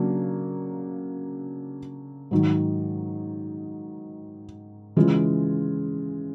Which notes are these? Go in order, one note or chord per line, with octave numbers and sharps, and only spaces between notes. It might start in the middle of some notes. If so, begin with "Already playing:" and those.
Already playing: C#3 F#3 A#3 D4
G#2 D#3 F#3
C#3 E3 G#3 C#4 F4